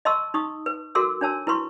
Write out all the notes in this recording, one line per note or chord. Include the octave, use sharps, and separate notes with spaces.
D#5 A5 C6 C#6 E6
D#4 C#6 D#6
B4
F#4 A4 A#4 C6 D6 E6
D4 C#5 A5 E6
E4 B4 C6 C#6